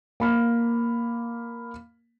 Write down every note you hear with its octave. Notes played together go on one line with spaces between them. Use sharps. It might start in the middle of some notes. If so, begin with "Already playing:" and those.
A#3 B5 F6